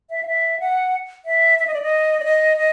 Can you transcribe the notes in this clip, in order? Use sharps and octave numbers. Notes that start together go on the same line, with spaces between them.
E5
F5
E5
F#5
E5
E5
D#5
D5
D#5
D5
D#5
D#5